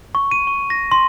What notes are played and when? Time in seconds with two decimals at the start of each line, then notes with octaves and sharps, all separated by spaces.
0.15 C#6
0.31 D#7
0.47 C#6
0.70 A#6
0.92 C6